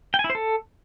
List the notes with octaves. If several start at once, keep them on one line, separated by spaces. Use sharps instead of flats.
G5
G#5
E4
C5
A4